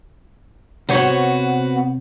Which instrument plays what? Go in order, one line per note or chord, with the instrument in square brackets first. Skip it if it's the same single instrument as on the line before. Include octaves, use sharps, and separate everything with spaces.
[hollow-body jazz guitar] C3 C5 C#5 [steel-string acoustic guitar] B3 F#4